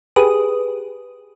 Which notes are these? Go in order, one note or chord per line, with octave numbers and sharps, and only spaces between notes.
G4 G#4 B4 D#6